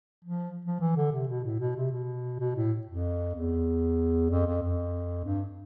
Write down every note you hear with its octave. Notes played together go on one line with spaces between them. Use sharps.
F3
F3
E3
D3
C3
B2
A2
B2
C3
B2
B2
A2
F2
E2
F2
F2
F2
G2